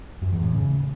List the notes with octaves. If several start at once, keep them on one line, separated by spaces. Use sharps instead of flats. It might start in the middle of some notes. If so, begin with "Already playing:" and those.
F#2
E2
A2
C#3